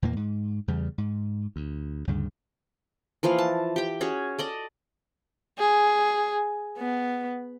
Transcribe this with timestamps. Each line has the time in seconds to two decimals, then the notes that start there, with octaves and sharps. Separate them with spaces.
0.02 E2 A#2 E3 A#3
0.16 G#2
0.68 E2 C#3 G3
0.98 G#2
1.56 D2
2.07 D2 G2 C#3
3.23 E3 F3 A#3 F5
3.38 A5
3.76 G4 G5
4.01 C#4 F#4 G#4 C#5
4.39 A4 D5 D#5
5.59 G#4
6.78 B3